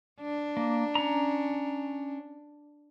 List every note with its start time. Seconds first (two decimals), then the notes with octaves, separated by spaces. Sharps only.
0.21 D4
0.57 A#3
0.95 C#4 A#5